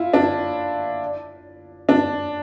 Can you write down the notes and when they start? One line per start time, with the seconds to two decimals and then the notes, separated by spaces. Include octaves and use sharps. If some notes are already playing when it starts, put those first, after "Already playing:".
Already playing: E4 F4
0.13 D4
1.89 D4